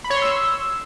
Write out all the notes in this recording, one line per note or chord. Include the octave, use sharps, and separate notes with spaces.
B5
C#5
C6
E6